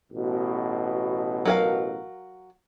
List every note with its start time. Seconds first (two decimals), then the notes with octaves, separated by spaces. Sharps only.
0.13 A1 B2
1.45 F#3 A#4 F5